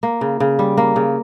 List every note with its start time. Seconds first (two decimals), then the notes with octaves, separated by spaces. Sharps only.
0.03 A#3
0.21 C#3
0.40 C#3
0.59 G3
0.77 A#3
0.96 C#3